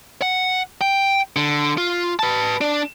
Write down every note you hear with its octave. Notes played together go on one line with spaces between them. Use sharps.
F#5
G5
D3
F4
B4 A5
D4